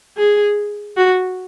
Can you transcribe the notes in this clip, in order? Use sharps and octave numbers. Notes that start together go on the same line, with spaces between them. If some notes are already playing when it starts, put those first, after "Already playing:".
G#4
F#4